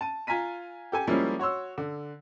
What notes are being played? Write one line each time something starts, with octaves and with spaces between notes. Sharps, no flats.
A5 D#7
F4 G#5 A#5 B6 D#7
G4 A4 G#5
F3 G3 G#3 A#3 C#4 E4
F#4 C#5 C6 E6
D3